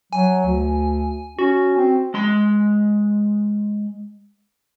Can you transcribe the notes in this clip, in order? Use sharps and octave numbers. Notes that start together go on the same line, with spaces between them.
F#3 G#5
D2
C#4 F#4
C4
G#3 C6